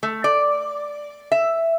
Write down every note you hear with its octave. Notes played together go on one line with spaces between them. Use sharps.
A3
D5
E5